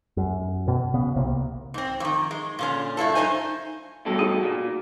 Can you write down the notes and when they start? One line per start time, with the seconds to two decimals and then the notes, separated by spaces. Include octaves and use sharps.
0.17 F#2
0.68 B2
0.94 C#3 B3
1.16 C2 C3 A#3
1.74 G#2 C4
2.00 F2 D#3
2.31 G#3
2.59 A#2 D3 C#4
2.97 G2 E4 F4 A4
3.15 G2 C3 D#4 C5 G#5
4.06 G2 B2 F#4 A4
4.19 D#4 G#4
4.43 A#2